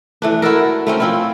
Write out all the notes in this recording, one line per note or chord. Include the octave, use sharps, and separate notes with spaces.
E3 A3 D4
E4 F#4 A4 A#4
A3 C4 C#4 A#4
F3 C4 E4